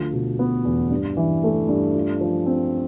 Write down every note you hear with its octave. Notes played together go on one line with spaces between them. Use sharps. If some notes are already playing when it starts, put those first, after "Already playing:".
Already playing: D2 F3 F4
B2
B3
E2
G2
E3
A3
G2
F4
F3
C4